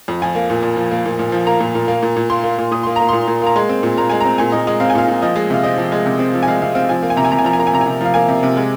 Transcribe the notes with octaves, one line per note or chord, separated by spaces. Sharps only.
F2
F3 G#5
A#3
A#2
A#2
F3
A#3
A#2
A#2
F3
A#3 A#5
A#2
A#2
A#3
A#2
A#2
A#3 C6
A#3
A#2
A#2 D#6
A#3 C6
A#3 A#5
A#2 C6
A#2
A#3 A#5
G#3 C6
C4
A#2
A#2 A#5
G#3 G#5
C4 A#5
A#2 G#5
A#2 D#5
G#3 D#5
C4 F5
G#5
A#2 F5
A#2
F3 D#5
G#3
C3 F5
C4 D#5
F3
G#3
C3
C4
F3
G#5
G#3 F5
C3 F5
C4 F5
F3 G#5
A#3
G#5
C3 A#5
G#5
C3 A#5
G#5
F3 A#5
G#5
A#3 A#5
G#5
C3 A#5
G#5
C3
F3 F5
A#3 G#5
C3
C3
G#3